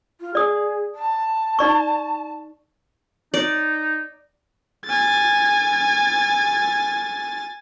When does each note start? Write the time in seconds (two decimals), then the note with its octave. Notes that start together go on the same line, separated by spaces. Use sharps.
0.21 F4
0.35 G#4 D5 D#6
0.95 A5
1.59 D#4 D5 C#6
3.34 D#4 D5
4.85 G#5 A6